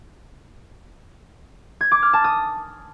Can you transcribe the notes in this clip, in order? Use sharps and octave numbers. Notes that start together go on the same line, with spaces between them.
G#6
D6
F6
A5
D#6